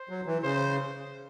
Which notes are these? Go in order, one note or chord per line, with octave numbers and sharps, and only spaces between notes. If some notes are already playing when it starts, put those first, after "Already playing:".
Already playing: C5
F#3
E3
C#3 C5